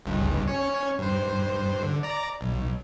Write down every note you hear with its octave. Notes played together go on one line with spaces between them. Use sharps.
G1 C#2 G2
C#4 C#5
G2 C5
D3
D5 A#5
B1